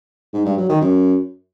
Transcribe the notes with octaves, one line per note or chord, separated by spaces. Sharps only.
G#2
G2
F#3
D#3
F#2